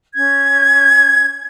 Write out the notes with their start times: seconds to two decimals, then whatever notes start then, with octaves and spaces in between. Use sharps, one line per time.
0.14 C#4 G#6